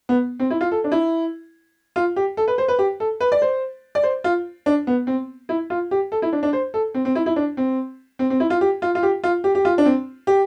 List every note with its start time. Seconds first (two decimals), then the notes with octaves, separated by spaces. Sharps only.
0.09 B3
0.40 C4
0.50 E4
0.61 F4
0.72 A4
0.84 D4
0.92 E4
1.96 F4
2.16 G4
2.37 A4
2.48 B4
2.58 C5
2.68 B4
2.79 G4
3.00 A4
3.21 B4
3.32 D5
3.42 C5
3.95 D5
4.03 C5
4.24 F4
4.66 D4
4.87 B3
5.07 C4
5.49 E4
5.70 F4
5.91 G4
6.12 A4
6.22 E4
6.33 D4
6.43 D4
6.53 C5
6.74 A4
6.94 C4
7.05 C4
7.15 E4
7.26 E4
7.36 D4
7.57 C4
8.19 C4
8.30 C4
8.40 E4
8.50 F4
8.61 G4
8.82 F4
8.95 F4
9.03 G4
9.24 F4
9.44 G4
9.55 G4
9.65 F4
9.78 D4
9.86 C4
10.27 G4